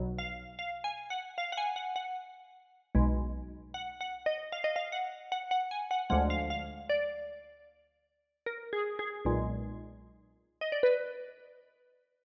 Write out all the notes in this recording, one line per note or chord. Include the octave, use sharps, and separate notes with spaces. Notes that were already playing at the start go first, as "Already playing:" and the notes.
Already playing: B1 B2 F#3
F5
F5
G#5
F#5
F5
F#5
G#5
F#5
F#5
B1 B2 G#3
F#5
F#5
D#5
F5
D#5
F5
F#5
F#5
F#5
G#5
F#5
D2 D3 F3 G#3 F#5
F5
F5
D5
A#4
G#4
G#4
B1 A#2 G#3
D#5
D5
B4